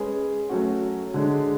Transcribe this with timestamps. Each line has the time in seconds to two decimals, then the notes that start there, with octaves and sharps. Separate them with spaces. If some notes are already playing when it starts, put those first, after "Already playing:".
Already playing: G#3 C#4 G#4 B4
0.49 F#3 A3 C#4 F#4
1.14 D3 G#3 D4